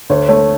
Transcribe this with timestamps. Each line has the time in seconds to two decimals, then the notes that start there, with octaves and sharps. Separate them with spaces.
0.10 D2 C#5
0.29 A3 C#5